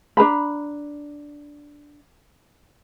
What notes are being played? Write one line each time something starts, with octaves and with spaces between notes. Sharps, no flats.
D4 B4 A#5 B5